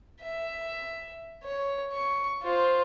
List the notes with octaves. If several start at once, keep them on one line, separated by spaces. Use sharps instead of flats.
E5
C#5
C#6
F4 C5